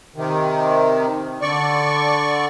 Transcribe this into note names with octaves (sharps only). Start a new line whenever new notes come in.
C3 D#3
D3 D5 C#6